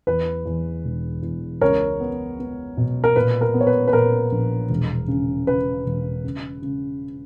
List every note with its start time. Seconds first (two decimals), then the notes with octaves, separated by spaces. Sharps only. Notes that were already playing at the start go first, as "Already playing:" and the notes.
0.07 E2 B4
0.46 E2
0.85 E1
1.23 E2
1.61 C#2 A#4 C#5
2.00 B3
2.39 B3
2.77 B2
3.04 A#4
3.16 A#2 B4
3.41 A#4
3.54 B3
3.61 C#5
3.67 B4
3.88 B4
3.93 A#2 A#4
4.32 A#1
4.70 E1
5.08 C#3
5.47 C#3 B4
5.86 E1
6.24 C#3
6.62 C#3